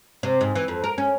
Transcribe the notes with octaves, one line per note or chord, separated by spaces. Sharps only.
C3
G#2
E3
F2
A#4
C#4